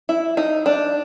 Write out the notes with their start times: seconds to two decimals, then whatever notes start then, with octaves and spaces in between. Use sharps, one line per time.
0.09 E4
0.37 D#4
0.66 D4